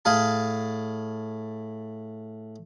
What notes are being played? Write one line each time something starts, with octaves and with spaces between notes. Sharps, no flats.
A2 G#4 F5 A5